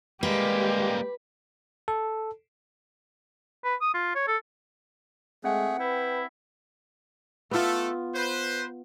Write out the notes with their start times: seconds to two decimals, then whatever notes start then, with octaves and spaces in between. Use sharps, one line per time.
0.23 G3 G#3 A#3 G4 B4
1.88 A4
3.64 B4
3.81 D#6
3.94 F4
4.15 C#5
4.27 A4
5.44 G#3 A3 C4 G#4 F#5
5.79 E4 B4 G5
7.51 A3 B3 F4 A4
8.13 B4 C5